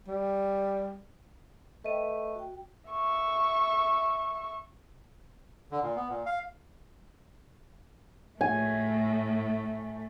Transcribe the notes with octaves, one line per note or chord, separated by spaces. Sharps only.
G3
A3 B4 C5 D#5 G5 D#7
F#4 G5
E5 C#6
D3
A#2
B3
A#2
F5
A2 A3 G#5